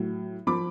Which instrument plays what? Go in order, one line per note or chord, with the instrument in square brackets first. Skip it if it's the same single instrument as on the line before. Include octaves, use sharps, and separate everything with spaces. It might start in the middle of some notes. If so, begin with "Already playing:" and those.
Already playing: [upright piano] A2 F#3
F3 B5 D6